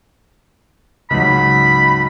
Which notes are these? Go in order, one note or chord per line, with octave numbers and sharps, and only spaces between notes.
C#2 G#2 F#3 B5